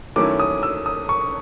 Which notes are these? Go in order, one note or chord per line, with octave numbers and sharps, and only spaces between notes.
D#3 F#3 A3 C#4 E4 D6
D#6
E6
D#6
C#6